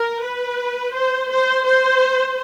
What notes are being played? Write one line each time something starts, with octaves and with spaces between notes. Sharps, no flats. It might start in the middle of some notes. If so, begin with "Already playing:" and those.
Already playing: A#4
B4
C5
C5
C5